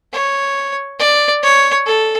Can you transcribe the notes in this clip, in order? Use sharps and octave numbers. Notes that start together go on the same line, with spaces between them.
C#5
D5
C#5
A4